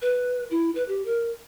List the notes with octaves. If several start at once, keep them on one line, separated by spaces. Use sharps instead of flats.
B4
E4
B4
G4
A#4